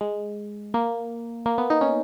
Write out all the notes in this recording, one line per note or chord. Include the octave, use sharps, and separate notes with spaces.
G#3
A#3
A#3
B3
D#4
C#4